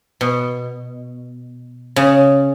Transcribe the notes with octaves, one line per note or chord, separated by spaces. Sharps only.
B2
C#3